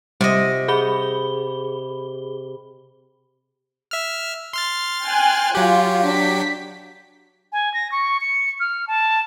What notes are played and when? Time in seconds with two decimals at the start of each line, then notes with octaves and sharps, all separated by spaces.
0.21 C3 G3 D#5
0.68 G#4 B5 G7
3.91 E5 F6
4.53 C6 F6 A6
5.05 G5 G#5 F#6
5.55 F#3 F4 G4
6.05 D4 B6
7.52 G#5
7.74 A#6
7.92 C#6
8.21 C#7
8.60 F6
8.88 A5